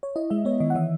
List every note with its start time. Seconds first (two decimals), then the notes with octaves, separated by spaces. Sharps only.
0.03 C#5
0.16 E4 D#5
0.30 G#3 E5
0.45 B3 C#5
0.60 D#3 D#5
0.70 F#5
0.75 E3 E5